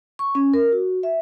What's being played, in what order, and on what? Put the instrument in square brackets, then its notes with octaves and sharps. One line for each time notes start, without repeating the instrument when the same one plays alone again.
[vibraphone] C#6
C#4
A#4
F#4
E5